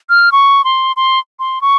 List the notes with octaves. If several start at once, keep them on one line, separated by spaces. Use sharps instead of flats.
F6
C#6
C6
C6
C6
C#6